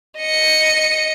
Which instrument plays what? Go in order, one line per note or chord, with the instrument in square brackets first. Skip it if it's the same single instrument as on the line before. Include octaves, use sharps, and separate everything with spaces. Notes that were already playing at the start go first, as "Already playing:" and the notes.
[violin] D#5 C#7